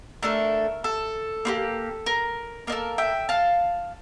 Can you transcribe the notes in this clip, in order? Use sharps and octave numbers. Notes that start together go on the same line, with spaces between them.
A3 D4 A4 A#4
A4
A#3 E4 G4
A#4
A#3 D4 A4 A#4
E5 G5
F5 A5